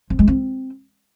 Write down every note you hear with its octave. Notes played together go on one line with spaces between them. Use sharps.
C4
G#3
C4